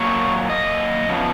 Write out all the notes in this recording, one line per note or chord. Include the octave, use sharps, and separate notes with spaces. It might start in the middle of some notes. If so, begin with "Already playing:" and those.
Already playing: A#2 F#3 A#3 C#5
D#5
C#3 F3 B3